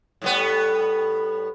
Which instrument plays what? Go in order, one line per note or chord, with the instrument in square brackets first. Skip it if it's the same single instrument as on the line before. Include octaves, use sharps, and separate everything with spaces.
[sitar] A2 G3 B3